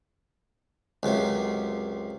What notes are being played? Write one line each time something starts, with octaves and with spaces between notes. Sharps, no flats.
C#2 F#2 C3